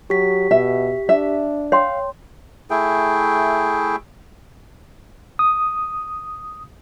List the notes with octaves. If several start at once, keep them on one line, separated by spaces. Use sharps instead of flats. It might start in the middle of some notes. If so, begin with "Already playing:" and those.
F#3 G4 B6
B2 E5
D4 E5
C#5 F5 G5 C6
A3 E4 G#4 G5
D#6